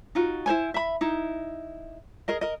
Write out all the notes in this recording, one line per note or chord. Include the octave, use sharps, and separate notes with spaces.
D#4 F4 F#4
E4 C5 C#5 G#5
E5 B5
D#4 E4
G#4 A#4 D#5
A#4 D#5